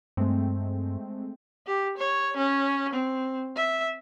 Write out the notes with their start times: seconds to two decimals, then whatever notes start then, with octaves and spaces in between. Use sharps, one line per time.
0.17 G2 G#3 A3 C4
1.67 G4
1.97 C#5
2.37 C#4
2.93 C4
3.56 E5